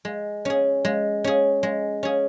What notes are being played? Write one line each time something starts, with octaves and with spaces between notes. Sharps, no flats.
G#3
C#4 G#4
G#3
C#4 G#4
G#3
C#4 G#4